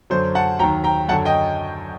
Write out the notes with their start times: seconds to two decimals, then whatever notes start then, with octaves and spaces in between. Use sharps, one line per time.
0.10 F#2 D3 F#3 C5
0.35 F#5 A5
0.59 D#2 D#3 F#3 G5 A#5
0.84 G5 A#5
1.08 F#2 D3 F#3 F#5 A5
1.25 D#5 G5